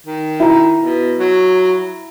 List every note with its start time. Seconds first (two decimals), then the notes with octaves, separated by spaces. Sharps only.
0.06 D#3
0.40 E4 A#5
0.79 B2
1.19 F#3